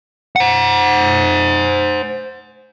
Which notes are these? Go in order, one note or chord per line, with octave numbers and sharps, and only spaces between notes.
C5 F#5